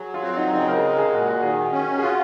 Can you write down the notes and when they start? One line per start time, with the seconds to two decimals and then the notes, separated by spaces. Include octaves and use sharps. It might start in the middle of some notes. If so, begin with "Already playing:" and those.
Already playing: F#3 G#4
0.14 F4
0.23 C4 F#4
0.37 D#4
0.53 C#3 D#4
0.68 A#4
0.77 G#4
0.83 G#3 A#4
0.98 G#4
1.12 A#2 F#4
1.28 F#4
1.42 D#3 G#4
1.72 C#4
1.98 G#4
2.02 F4 F#4